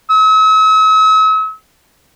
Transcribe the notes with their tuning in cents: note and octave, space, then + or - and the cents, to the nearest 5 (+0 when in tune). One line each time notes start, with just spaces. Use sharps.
E6 -45